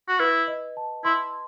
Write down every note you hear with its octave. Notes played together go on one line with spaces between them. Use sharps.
F#4
E4 B4
D#5
A5
E4 C6